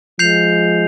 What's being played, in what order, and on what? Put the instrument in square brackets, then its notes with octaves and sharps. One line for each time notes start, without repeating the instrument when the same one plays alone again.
[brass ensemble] F3 G#3 [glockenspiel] G6 C7 F7